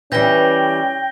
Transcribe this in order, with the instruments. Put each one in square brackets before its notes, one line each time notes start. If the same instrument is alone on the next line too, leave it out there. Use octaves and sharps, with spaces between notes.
[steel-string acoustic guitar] E3 G3 [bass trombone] C#4 [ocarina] G5 [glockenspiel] G6 A#6 G7